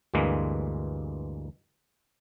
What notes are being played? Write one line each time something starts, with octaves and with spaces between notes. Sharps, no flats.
D2 G2 E3 G#3 A#3